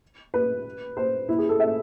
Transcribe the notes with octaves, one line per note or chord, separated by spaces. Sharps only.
B4
C5
E4
G#4
A4
E5